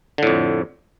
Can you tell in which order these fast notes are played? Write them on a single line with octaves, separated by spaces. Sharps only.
D3 A2 F2